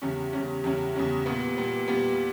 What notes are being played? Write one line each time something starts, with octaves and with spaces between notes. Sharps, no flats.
E2 C#3 G3 C#4
E2 C#3 G3 C#4
E2 C#3 G3 C#4
E2 C#3 G3 C#4
A#2 G3 B3
A#2 G3 B3
A#2 G3 B3